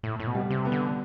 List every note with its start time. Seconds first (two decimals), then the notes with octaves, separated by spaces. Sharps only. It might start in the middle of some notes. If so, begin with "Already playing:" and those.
0.03 A2
0.20 A2
0.27 B2
0.35 G3
0.50 C3
0.65 B3
0.72 D3